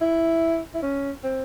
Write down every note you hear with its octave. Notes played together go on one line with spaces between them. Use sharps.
E4
E4
C#4
C4